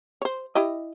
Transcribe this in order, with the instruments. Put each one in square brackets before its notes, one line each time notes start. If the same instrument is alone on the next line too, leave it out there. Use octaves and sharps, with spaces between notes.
[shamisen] C5 C#5
E4 G4 D#5